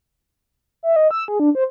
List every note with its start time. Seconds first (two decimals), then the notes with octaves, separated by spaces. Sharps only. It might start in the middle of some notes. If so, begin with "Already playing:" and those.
0.83 E5
0.96 D#5
1.11 E6
1.28 G#4
1.40 D4
1.55 C5